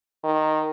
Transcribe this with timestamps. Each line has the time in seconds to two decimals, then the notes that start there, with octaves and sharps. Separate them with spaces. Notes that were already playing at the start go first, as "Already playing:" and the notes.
0.24 D#3